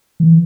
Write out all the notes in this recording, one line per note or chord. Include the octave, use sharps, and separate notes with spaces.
E3